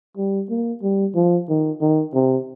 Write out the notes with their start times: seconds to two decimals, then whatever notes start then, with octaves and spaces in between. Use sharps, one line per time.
0.17 G3
0.50 A#3
0.82 G3
1.15 F3
1.49 D#3
1.81 D#3
2.14 C3